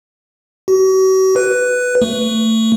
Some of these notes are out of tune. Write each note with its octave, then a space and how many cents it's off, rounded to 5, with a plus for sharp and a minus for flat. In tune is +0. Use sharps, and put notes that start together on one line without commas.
F#4 +40
B4 +5
A3 +25